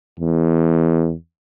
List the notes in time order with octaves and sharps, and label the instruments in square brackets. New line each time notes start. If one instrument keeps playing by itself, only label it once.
[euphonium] E2